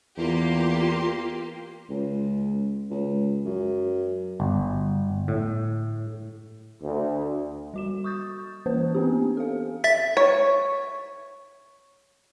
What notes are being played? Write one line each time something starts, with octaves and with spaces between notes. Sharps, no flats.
E2 A#3 F4 G4 C6
C#2
C#2
F#2
G1
A2
D2
G3 F#4 E7
C#6 D#6 G6 A6
E3 A#3 C#4 B4 C5
B3 C4 D4 G4
A4 F5
E5 A6 B6
C#5